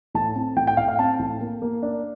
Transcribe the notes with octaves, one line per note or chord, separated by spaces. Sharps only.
A2 A5
C4
A2 G5
G5
A2 F5
F5
C4 A5
A2
A#3
A#3
D4